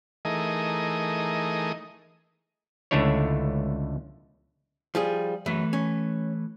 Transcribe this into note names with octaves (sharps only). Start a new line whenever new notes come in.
E3 A3 D#4 G#4 A#4 D#5
C#2 D3 A3 D4 E4 C#5
F3 G3 G#4
F#2 E3 A3 B4
C#4